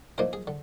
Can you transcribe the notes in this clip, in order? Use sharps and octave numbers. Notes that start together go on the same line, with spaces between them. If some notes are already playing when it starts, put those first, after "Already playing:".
A#2 F3 A#3 D#4 A#4
G#4
D3